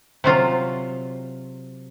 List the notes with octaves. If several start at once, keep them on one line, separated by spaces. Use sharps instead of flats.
C3 F#3 F4